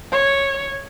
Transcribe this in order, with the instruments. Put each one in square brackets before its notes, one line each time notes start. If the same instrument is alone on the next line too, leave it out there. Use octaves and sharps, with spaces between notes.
[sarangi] C#5